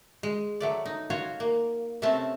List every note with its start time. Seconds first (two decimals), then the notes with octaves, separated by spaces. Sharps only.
0.23 G#3
0.60 F#3 A3 D5
0.86 D#4
1.10 F4 F#4 C#5
1.40 A#3
2.02 C3 A3 C4 C#4 A5